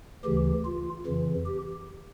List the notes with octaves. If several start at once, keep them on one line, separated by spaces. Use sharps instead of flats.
D2 C#3 E3 G4
F4
F2 C#3 E3
G4